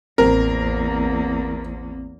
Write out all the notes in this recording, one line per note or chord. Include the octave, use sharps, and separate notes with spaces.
A1 E2 A#3 C4 A#4